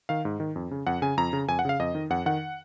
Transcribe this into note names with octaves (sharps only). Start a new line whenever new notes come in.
D#3 F5
G#2
D#3
F2
C#3
F2 F#5
C#3 G#5
F2 A#5
C#3
F2 G#5
F#5
C#3 F5
F2 D#5
D#3
F2 F#5
D#3 F#5